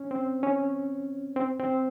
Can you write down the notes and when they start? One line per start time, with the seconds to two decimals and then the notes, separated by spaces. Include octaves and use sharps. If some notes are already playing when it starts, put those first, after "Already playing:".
Already playing: C#4
0.11 C4
0.43 C#4
1.36 C4
1.59 C4